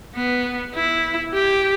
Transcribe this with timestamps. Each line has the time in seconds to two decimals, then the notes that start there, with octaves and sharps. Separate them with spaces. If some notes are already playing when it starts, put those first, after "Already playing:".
0.15 B3
0.75 E4
1.34 G4